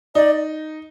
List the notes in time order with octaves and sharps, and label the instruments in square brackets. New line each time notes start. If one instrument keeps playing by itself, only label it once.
[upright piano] D#4 [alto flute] D5